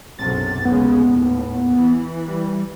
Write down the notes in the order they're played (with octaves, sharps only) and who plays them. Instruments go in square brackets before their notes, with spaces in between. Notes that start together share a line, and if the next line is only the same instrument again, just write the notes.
[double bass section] B1 F#2 C3 [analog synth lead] A6
[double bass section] D#2 C#3 G#3 [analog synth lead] B3
[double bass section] D#2 A2
E3
[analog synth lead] G3